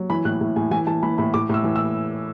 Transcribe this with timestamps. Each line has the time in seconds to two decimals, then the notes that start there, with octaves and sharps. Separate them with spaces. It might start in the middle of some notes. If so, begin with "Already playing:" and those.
Already playing: F#3
0.10 E3 B5
0.25 A2 F#6
0.41 A2
0.56 A2 G#5
0.71 E3 G#5
0.87 E3 A5
1.03 E3 B5
1.18 A2 B5
1.34 A2 D6
1.49 A2 E6
1.64 E3
1.76 E6